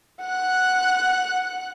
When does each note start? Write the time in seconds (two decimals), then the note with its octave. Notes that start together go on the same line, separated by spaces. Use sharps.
0.21 F#5 F#6